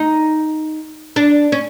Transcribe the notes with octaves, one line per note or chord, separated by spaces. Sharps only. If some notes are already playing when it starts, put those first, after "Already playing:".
Already playing: D#4
D4
C#4